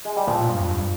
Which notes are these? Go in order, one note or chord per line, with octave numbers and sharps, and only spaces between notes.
G#3
G3
A#2 F3
A#2
G2
F2
G2